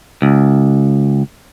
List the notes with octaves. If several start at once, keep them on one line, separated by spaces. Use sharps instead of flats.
C#2